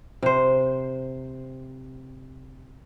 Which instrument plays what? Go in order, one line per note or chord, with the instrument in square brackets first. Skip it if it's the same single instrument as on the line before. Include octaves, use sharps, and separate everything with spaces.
[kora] C3 C5